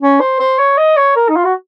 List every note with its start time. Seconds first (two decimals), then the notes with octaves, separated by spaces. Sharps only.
0.01 C#4
0.20 C5
0.40 C5
0.58 C#5
0.78 D#5
0.97 C#5
1.16 A#4
1.29 D#4
1.36 F4
1.45 F#4